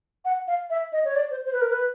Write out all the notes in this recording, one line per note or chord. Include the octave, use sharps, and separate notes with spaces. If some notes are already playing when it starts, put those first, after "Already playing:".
F#5
F5
E5
D#5
C#5
D5
C5
C5
B4
A#4
B4